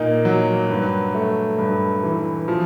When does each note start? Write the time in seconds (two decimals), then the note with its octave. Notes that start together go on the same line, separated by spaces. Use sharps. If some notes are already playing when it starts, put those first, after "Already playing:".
Already playing: A#2 A#3 D#4
0.25 F#3
0.70 G2
1.14 A3
1.58 G2
2.03 E3
2.48 F3